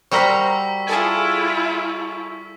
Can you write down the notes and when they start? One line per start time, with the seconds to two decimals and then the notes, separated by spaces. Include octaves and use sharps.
0.11 G3 F#4 A#4 C5 A#5 C#6 E6 B6
0.87 E4 F4 G#4 A4 G#5